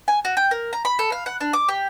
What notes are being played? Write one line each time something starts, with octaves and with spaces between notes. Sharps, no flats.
G#5
F#4
G5
A#4
A#5
B5
A4
F5
F#5
D4
D6
G4